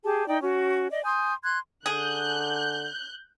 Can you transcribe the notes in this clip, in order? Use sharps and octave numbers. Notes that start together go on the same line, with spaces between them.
G4 G#4 A5
D#4 D5 G5
C#4 F#4
D5 D#5
G#5 C6 D#6 G6
C6 F#6 G#6
D3 G#4 F#6 G6